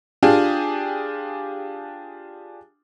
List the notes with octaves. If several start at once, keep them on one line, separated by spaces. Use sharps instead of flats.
D4 F4 G4 G#4